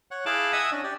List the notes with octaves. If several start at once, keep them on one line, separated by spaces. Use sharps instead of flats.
C#5 F#5
E4 G#4 F5 A5 D6 F#6
D#5 E5 F#5 G#5 D#6 E6
C#4 D4
G4 D5